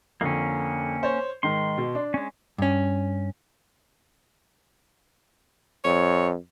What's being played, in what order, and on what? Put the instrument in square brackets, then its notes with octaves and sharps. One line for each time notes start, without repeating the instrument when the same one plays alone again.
[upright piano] F2 D3 [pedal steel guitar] A#3 C#4
[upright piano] C5 C#5
[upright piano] G#2 D#3 [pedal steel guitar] C6
[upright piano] B2
D4
[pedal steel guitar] G#3 C#4
[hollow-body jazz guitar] G2 C#4
[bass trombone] F2 [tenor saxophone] C#5